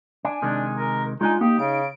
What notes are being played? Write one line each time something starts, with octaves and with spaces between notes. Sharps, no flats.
D4 G#5
C3 D#3 G#3 D4
A#4
G#3 D4 D#4 F4 G#5
A#3 D#4 G4
C#3 D7